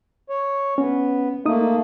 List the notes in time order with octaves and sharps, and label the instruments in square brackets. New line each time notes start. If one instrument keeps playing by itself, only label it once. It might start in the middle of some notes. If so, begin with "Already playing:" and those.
[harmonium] C#5
[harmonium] B3 [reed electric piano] C#4
[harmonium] A3 A#3 [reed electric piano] D#4 D#6